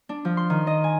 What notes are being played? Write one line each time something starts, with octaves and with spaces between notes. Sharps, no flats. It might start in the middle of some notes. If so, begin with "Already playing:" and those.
D4
F3
C6
D#3
D#5
G#5